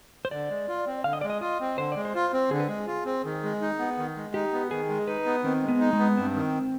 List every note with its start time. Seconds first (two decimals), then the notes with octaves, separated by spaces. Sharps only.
0.25 C5
0.31 D3 D5
0.49 G#3
0.68 F4
0.86 C4
1.04 D3 F5
1.13 D#5
1.21 G#3 D5
1.30 D#5
1.41 F4 D#5
1.60 C4
1.78 D3 C5
1.92 G#3 D5
2.05 C5
2.15 F4
2.33 C4
2.51 D3 G#4
2.60 B4
2.68 G#3 G#4
2.87 F4
3.06 C4
3.25 D#3
3.43 G#3
3.61 D#4
3.79 B3
3.98 D#3
4.16 G#3
4.34 D#4 G4
4.53 B3
4.70 D#3 G#4
4.89 G#3
5.07 D#4 B4
5.25 B3
5.44 D#3 C4
5.63 G#3
5.68 B3
5.80 D#4
5.93 G#3
5.99 B3
6.17 G2 C4
6.36 D#3